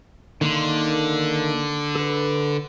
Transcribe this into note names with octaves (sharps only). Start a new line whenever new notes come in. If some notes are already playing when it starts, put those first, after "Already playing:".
D3 D#3 A#3 C6
A4 B4